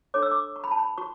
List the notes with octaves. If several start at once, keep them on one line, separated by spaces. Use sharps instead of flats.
D4 A4 C#5 D6
E6
D6
C#6
B5
A5
B5
F#4 C#6